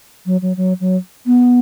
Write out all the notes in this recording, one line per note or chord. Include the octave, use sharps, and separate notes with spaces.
F#3
F#3
F#3
F#3
B3